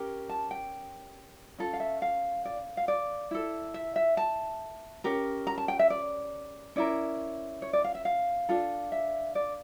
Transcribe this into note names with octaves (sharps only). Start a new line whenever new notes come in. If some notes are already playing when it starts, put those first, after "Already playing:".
Already playing: C#4 G4 A#4
A5
G5
C#4 F4 A4
F5
E5
F5
D5
F5
D5
E4 A4
E5
E5
A5
C#4 G4 A#4
A#5
A5
G5
E5
D5
C#4 E4 A#4 D5
C#5
D5
F5
E5
F5
D4 F4 A4
E5
D5